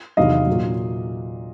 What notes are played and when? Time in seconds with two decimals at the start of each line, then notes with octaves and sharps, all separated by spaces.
0.17 E2 C3 D#3 F#3 D#5 F5
0.47 A#2 F#3